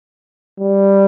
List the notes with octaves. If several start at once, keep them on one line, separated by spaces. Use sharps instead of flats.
G3